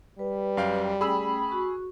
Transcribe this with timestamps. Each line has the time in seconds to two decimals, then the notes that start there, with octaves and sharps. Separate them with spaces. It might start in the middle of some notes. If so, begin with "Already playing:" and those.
0.19 G3 B4
0.57 F#2 F5 G5
1.01 A3 C#4 G#4 G5 B5 E6
1.49 F#4 C#6